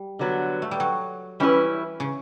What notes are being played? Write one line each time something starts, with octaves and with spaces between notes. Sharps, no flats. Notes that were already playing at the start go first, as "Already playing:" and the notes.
Already playing: G3
D3 F#3 B3
A3
G3
F#3
E3 G3 C#4 E4 B4
C#3